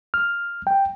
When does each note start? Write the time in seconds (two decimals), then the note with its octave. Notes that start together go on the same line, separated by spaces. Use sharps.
0.14 F6
0.67 G5